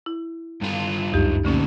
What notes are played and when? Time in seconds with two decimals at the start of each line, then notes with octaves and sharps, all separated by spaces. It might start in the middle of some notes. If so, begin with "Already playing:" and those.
0.06 E4
0.61 G2 F4
1.13 C#2 F#2 D#4 G4
1.45 D2 A#2 D3 C#4